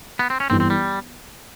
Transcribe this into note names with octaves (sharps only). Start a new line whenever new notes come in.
B3
C4
C#4
G1 G2 E3 C4
C4
G3